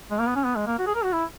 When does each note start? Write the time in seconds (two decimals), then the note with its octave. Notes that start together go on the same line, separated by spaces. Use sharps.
0.11 G#3
0.19 A#3
0.27 B3
0.35 C#4
0.44 B3
0.56 G#3
0.67 A#3
0.79 F#4
0.86 G#4
0.95 A#4
1.04 F#4
1.12 E4